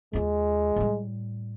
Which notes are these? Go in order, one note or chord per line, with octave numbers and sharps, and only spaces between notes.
D#2 G#3 F4
A2 G3